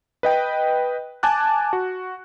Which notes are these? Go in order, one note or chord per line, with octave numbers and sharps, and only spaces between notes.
B4 D#5 G5
G#5 A5 D6 F#6
F#4